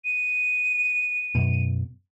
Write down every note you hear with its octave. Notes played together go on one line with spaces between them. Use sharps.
D#7
F#2 B2